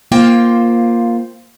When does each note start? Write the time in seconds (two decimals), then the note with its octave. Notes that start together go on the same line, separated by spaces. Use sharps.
0.12 A#3 F4 C5 G5